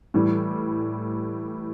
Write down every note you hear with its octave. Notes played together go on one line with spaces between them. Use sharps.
A2 E3 G3